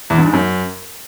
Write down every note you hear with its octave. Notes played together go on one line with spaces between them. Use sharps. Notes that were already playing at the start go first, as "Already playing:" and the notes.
E2
G2
G#2
F#2